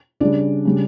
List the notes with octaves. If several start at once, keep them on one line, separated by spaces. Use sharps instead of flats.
C#3 G3 D4 D5
C#3 G3